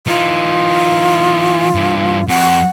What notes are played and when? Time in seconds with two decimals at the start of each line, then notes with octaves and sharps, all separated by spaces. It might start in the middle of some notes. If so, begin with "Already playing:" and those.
0.07 E3 D#4 F4
1.75 G2 E3
2.28 F2 F#5